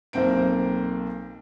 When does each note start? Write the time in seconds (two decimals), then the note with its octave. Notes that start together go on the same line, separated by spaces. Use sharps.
0.13 B1 A#3 C4 C5 D7